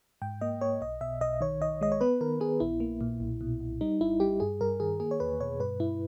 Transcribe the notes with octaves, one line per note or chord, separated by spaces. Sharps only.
G#2 G5
A#3 D#5
A#3 C#5
B1 D#5
B2 E5
B1 D#5
D#3 C#5
D#3 D#5
G#3 D#5
C#5
B3 B4
D#3 A#4
B3 G#4
A#1 E4
A#3
A#2
B1
B2
B1
G3 D#4
G#1 E4
G3 G4
G2 G#4
G2 A#4
D#3 G#4
A#3 G#4
C#5
E2 B4
B2 C#5
G2 B4
G2 E4